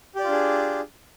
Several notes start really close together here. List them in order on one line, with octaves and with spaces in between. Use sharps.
G4 D5 F4 D4 G#4